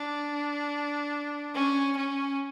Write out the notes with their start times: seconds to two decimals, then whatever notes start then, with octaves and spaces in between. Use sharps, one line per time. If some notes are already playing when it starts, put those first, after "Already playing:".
Already playing: D4
1.54 C#4
1.97 C#4